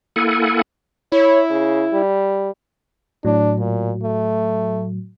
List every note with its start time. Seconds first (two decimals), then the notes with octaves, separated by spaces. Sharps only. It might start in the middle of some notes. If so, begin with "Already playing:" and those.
0.16 A#3 E4 A4 F#5 G#5
1.12 E4 C#5
1.50 C#3
1.93 G3
3.25 A2 F#3 D4
3.59 A#2
4.03 A3